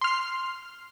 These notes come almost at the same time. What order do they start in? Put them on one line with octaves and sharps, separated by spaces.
C6 F6 C7